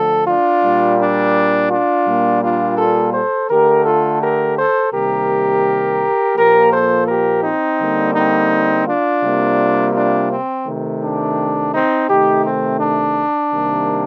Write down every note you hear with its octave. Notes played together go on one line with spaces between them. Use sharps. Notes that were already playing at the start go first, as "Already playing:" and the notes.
Already playing: D3 F3 A3 A4
D4 F4
A#2 G3 A#3
D4
D4 F4
A#2 G3 A#3
D4 F4
F4 A4
A4 C5
D3 A3 G4 A#4
F4 A4
G4 A#4
A4 C5
C3 D#3 G3 A#3 G4 A#4
A#2 F3 A#3 G4 A#4
A4 C5
G4 A#4
C4 D#4
D3 G3 A#3
C4 D#4
D4 F4
C3 G3 A#3
D4 F4
C4
C3 D#3 A3
D4
C4 D#4
C3 D#3 A3 D#4 G4
C4
D4
C3 D#3 G3 A#3